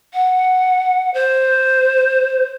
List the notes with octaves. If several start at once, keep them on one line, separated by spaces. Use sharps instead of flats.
F#5
C5